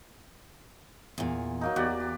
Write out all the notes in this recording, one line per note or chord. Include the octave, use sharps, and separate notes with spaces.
E2 A#2
F#3 A#3 D#4
E2 F#4 G4 D5
G4